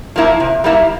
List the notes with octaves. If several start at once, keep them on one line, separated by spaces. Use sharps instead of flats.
F3 A#3 E4
C3
G3 A#3 E4